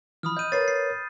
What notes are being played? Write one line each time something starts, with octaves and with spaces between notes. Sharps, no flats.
E3 F3 B5 D#6 F6
D#5 G6 D#7
A#4 B4 C#5 A6 C7
C7